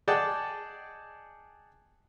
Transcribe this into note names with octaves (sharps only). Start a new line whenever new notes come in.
G#4 D5 D#5 F#5 G5 A5